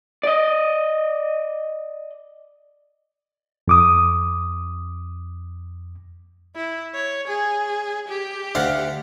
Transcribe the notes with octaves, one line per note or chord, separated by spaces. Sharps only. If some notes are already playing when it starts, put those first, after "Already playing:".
D5 D#5
F2 D6 D#6
E4
C#5
G#4
G4
D2 F5 F#5